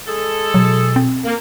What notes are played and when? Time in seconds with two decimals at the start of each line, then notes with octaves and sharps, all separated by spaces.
0.06 G#3 G#4 A4
0.54 B2 F#3
0.96 C4
1.25 A#3